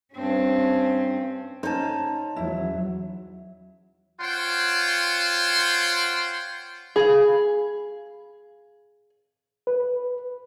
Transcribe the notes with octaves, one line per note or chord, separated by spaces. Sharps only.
G2 C4 C#4
C#4 D#4 C5 A5
E2 F#3 E4
F4 C5 C#5 F#5 G5 C6
G#4 F5 G#5 B5
B4